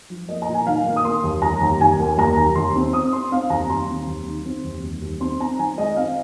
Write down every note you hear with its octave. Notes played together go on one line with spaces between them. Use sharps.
F3
A#3 D#5
A#5
A#2
G#5
D#3 F5
A#3
D#6
A#3 C6
D#2
D#2 A#5
D#2
D#2 G#5
A#3
D#2 A#5
D#2
D#2 C6
C4
C4 D#6
C4 C6
C4 F5
D#2 A#5
D#2 C6
C4
D#2
D#3
C4
D#2
D#2
D#2
C4 C6
C4 A#5
D#3 G#5
G#3 D#5
C4 F5